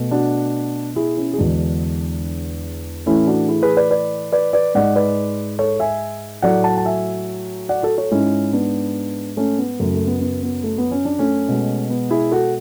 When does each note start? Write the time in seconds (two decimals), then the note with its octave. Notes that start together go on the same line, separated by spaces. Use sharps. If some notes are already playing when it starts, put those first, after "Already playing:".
Already playing: B2 A3
0.11 D4 F#4
0.96 E4 G#4
1.17 C#4 E4
1.34 G#4
1.38 E2 D3 G#3 D4 F#4
3.06 A2 E3 A3 C#4 E4
3.27 D4 F#4
3.48 E4 G#4
3.62 G#4 B4
3.77 B4 D5
3.91 B4 D5
4.32 B4 D5
4.53 B4 D5
4.75 G#2 G#3 D5 F#5
4.96 B4 D5
5.59 A4 C#5
5.80 E5 G#5
6.42 A2 F#3 A3 D5 F#5
6.64 F#5 A5
6.77 A5
6.85 E5 G#5
7.69 D5 F#5
7.83 F#4 A4
7.98 A4 C#5
8.11 G#2 G#3 C#4 E4
8.53 B3 D4
9.37 A3 C#4
9.58 B3
9.80 F#2 C#3 F#3 A3
9.94 A3
10.07 B3
10.21 B3
10.43 B3
10.64 A3
10.78 B3
10.91 C#4
11.05 D4
11.19 A3 C#4
11.49 B2 G#3
11.90 B3
12.11 E4 G#4
12.32 F#4 A4